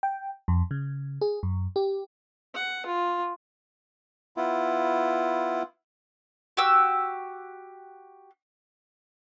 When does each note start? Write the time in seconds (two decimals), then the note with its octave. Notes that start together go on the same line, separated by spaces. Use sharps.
0.03 G5
0.48 F2
0.71 C#3
1.21 G#4
1.43 F#2
1.76 G4
2.54 F#5
2.86 F4
4.37 B3 E4 F4
6.57 F#4 G4 E6